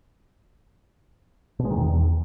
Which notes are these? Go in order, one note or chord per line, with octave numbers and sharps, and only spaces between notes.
B2
G#3
D#3
E2